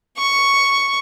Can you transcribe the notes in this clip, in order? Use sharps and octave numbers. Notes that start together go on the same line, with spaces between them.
C#6